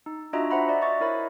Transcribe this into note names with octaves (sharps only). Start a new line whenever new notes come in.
D#4
D4 F4 F#4 D#5 E5 A#5
C5 E5 F#5 A#5 B5
D5 E5
D#5 C#6 A6
E4 A#4 C#5 B5